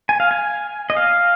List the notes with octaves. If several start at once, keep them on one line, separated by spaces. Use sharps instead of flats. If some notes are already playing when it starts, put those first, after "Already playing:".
G#5
F5
G#5
D#5
F5